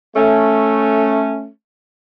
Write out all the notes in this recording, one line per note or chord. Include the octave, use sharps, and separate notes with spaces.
A3 C#4